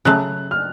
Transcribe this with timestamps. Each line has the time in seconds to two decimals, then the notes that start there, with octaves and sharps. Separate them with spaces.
0.05 C#3 F#3 A3 F#6
0.51 F6